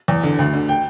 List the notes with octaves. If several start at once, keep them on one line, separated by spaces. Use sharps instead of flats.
E2
D3
D2
D3
G5